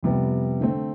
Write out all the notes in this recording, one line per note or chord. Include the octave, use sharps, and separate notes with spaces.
F2 C3 G3 B3
D3 A3 C4